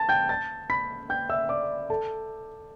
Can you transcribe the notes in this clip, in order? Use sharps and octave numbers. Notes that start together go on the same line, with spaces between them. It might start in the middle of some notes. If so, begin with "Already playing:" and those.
Already playing: A5 A6
G5 G6
A5 A6
B5 B6
G5 G6
E5 E6
D5 D6
A4 A5